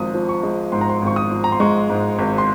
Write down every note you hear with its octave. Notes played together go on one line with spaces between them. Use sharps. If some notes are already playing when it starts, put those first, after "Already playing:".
Already playing: G#1 G#2 F3 D#6
F3
C#6
G#3
G#2 C6
A#5
C6
G#1 C#6
D#6
F3
A#5
C6
G#3 C#6
G#2
G#1
C6